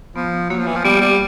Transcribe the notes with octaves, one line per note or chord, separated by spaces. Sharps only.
F3 B3
F#3 A#3
F3
E3
F3
G3 B3
G3